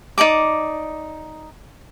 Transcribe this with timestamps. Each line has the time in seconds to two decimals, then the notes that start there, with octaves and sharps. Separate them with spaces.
0.18 D#4 D5 A5 D6